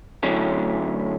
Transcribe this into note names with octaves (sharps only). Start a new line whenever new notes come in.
D3 F#3 A3 C#4